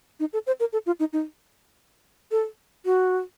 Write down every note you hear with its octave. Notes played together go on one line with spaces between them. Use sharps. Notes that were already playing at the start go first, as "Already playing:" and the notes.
D#4
A4
C5
A#4
A4
F4
D#4
D#4
A4
F#4